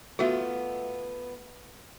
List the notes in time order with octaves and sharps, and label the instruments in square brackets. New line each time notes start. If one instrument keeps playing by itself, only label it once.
[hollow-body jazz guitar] A3 B3 F4 [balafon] F#4 E5